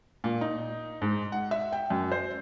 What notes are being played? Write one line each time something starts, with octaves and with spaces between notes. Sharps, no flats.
A#2
D#4
G#2
F#5
E5
G5
F#2
C5